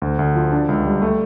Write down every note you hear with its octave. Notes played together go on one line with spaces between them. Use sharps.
D2
D2
F3
D4
C#2
G3
A3